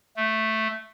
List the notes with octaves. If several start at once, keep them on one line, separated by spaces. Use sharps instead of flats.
A3